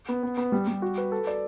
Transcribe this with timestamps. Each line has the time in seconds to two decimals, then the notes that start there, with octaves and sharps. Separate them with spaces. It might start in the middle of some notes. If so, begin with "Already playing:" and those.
0.09 B3
0.23 B3
0.37 B3
0.52 G3
0.68 G3
0.82 F#4
0.98 B4
1.12 A4
1.27 D5